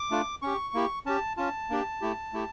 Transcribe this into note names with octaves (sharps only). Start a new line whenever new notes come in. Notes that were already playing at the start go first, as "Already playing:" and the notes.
Already playing: D6
A3 D4 F4
C#4 G4 C#6
A#3 E4 G4
C#4 G4 A5
C#4 F4 A5
A#3 D4 G4
A3 E4 G4
A3 E4 G4